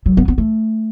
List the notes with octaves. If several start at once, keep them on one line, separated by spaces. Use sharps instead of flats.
F#3
B3
B3
A3